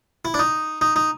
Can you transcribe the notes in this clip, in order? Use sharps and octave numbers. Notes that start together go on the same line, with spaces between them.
E4
D4
D#4
D#4
D#4